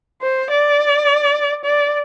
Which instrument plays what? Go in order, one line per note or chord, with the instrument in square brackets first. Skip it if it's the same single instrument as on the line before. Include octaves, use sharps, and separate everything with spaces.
[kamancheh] C5
D5
D5